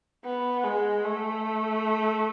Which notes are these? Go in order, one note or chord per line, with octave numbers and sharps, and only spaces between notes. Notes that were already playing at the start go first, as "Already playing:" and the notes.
B3
G#3
A3